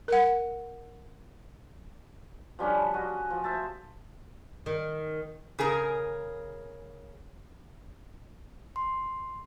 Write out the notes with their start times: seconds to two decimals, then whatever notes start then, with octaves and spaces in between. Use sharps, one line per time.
0.08 A#4 F#5
2.59 F3 G3 C#4 D4
2.94 F#4 D#5
3.30 F3
3.44 C5 E5 A5
4.66 D#3
5.59 C#3 G#4 A#4
8.76 C6